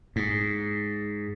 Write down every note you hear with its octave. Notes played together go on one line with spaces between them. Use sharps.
G#2